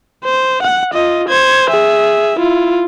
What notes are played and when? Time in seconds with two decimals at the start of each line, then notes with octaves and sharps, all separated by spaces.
0.25 C5
0.62 F#5
0.94 F4 D#5
1.28 C5 G#6
1.70 G#4 E5
2.38 E4 F4